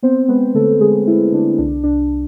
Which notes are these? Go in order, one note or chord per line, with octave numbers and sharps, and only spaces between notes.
B3 C4 C5
G#3 B3 B4
D3 A3 A4
D3 G#3 G#4
G#3 E4
D3 D4
C2 D4
C2 D4